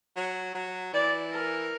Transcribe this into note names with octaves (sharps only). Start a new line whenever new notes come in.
F#3
F#3
E3 D5
A#4